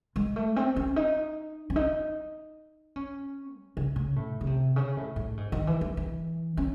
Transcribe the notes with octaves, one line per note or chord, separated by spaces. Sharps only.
G#3
A3
C4
C#4
D#4
C#4
D#4
C#4
F#3
C#3
C#3
A2
C#3
C3
C#3
A2
A2
G#2
D#3
E3
E3
E3
C#4